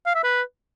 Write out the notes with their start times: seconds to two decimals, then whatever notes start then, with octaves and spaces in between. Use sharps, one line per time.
0.06 F5
0.15 E5
0.24 B4